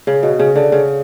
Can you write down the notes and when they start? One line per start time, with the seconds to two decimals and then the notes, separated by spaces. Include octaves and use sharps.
0.07 C#3
0.23 B2
0.39 C#3
0.55 D3
0.72 C#3